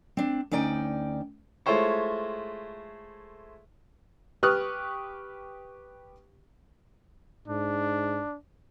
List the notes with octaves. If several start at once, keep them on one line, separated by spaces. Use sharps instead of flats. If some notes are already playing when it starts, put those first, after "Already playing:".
C4 D4
D2 C#4 D#4 D5 G5
G#3 A3 E4 F4 C5 C#5
G4 B4 C#6 D#6 F6 F#6
G#2 D4